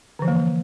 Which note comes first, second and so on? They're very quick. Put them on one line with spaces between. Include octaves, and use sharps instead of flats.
D3 F3 E3 A#3